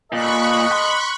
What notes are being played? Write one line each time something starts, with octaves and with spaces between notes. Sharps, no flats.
A#2 A4 D#5 B5 C#6 F#6
C6